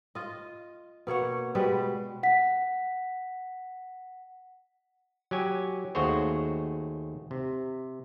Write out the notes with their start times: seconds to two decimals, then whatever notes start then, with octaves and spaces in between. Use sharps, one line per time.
0.15 F4 D#5
1.07 B2 A#3 C#5 F#5
1.55 B2 G3 G#3 B4
2.23 F#5 B6
5.31 F#3 G4 G#5
5.95 D#2 A3 F#4 G#4 C5 C#5
7.31 C3